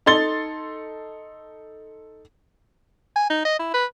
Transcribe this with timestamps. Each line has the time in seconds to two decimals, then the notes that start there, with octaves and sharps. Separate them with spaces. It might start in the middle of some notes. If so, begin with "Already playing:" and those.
0.06 D#4 A4 C6 A6 G7
3.16 G#5
3.30 D#4
3.45 D#5
3.59 E4
3.74 B4